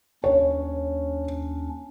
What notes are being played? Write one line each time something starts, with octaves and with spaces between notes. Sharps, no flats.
D#2 C#4 D4 C#5